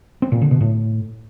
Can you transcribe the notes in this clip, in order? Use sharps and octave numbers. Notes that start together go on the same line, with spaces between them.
C4
A#2
D3
B2
A2